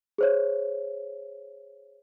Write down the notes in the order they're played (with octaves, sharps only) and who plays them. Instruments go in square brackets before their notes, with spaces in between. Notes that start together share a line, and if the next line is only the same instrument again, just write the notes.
[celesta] G#4 C5 C#5